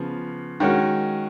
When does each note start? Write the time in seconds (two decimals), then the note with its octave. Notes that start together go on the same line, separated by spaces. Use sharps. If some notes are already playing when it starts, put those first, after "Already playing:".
Already playing: C#3 F3 B3
0.60 D#3 G#3 C#4 F#4